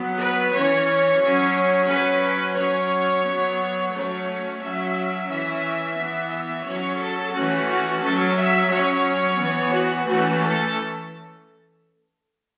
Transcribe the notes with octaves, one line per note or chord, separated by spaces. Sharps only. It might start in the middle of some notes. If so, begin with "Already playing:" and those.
Already playing: F#3 B3
B4
E3 C#4 C#5
F#3 C#4
F#3 C#4 B4
F#3 C#4 C#5
F#3 B3
F#3 A3 C#4 C#5
F#3 C#4 E5
E3 C#4 E5
E3 B3
E5
F#3 C#4 C#5
A4
E3 A3 C#4 F#4
F#4
F#3 C#4 A4
E5
F#3 C#4 C#5
E3 B3
F#4
E3 A3 C#4 F#4
A4